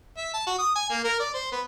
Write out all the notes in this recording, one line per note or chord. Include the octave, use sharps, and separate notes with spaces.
E5
A5
F#4
D#6
G#5
A#3
A#4
D5
C5
B3